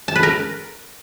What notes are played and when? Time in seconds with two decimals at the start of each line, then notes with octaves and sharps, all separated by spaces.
0.08 A5
0.16 B4
0.23 A#4